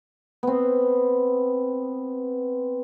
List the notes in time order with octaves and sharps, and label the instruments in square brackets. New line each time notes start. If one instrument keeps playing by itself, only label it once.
[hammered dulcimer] B3 C4